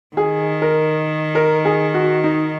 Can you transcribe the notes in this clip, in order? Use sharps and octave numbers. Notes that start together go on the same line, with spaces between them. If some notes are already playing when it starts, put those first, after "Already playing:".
D#3 G#4
A#4
A#4
G#4
F#4
D#4